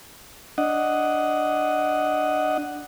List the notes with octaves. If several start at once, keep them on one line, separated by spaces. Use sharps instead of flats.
D4 D#5 F#5